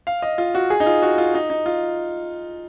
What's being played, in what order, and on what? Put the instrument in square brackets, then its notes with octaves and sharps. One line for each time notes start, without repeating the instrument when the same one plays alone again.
[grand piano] F5
D#5
F4
F#4
G#4
D#4
F4
F#4
F4
D#4
D#4
F4